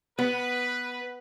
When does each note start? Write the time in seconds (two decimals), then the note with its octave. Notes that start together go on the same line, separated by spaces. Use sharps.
0.19 B3 B4